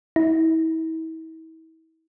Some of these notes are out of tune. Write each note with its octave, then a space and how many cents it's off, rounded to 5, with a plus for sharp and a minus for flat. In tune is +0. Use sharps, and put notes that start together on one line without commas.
E4 -40